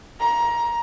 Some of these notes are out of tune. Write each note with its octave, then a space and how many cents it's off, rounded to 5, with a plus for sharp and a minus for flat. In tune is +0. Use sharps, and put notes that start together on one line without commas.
A#5 +20